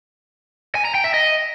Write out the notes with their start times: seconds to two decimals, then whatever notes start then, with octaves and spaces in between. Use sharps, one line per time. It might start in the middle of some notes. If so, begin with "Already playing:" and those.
0.75 G#5
0.85 A#5
0.95 G5
1.04 E5
1.14 D#5